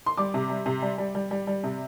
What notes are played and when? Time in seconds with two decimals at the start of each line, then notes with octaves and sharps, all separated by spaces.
0.06 C6
0.17 G3 D6
0.34 C3
0.50 G3
0.66 C3
0.82 G3
0.98 G3
1.15 G3
1.31 G3
1.47 G3
1.64 C3